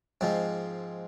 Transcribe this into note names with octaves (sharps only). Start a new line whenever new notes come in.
G#2 F3 G#3 C4